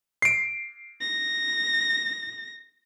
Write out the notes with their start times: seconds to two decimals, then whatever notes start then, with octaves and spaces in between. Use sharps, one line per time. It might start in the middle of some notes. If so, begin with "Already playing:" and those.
0.22 C7 D7
1.01 A#6